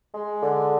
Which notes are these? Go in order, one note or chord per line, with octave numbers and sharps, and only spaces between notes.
G#3
D3